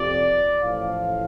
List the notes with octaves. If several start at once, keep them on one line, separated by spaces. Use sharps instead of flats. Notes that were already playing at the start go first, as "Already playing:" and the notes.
Already playing: F2 C3 F3 D5
A1 A2 F3 F5